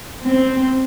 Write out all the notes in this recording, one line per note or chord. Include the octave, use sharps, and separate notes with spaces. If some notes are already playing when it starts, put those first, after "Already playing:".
C4